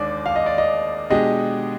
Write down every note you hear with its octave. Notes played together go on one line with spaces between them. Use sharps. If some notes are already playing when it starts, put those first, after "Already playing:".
Already playing: D#2 D#3 G#3 D4 D5
F5
D#5
D5
D#5
B2 G#3 D4 G4 D#5